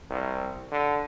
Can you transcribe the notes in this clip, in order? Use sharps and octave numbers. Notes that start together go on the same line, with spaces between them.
C2
D3